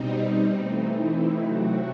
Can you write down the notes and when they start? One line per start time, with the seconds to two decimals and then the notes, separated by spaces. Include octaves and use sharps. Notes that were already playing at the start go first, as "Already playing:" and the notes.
Already playing: B2 G3 C4 D#4
0.11 C4
0.53 E3 A3 C4 D#4
0.96 E4
1.38 C3 F#3 A3 C4 F#4